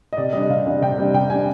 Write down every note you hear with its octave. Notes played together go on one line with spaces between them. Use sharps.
D#5
C3 D5
G3 D4 D#5
C3 F5
G3 D4
C3 G5
G3 D4
C3 G5
G3 D4 G#5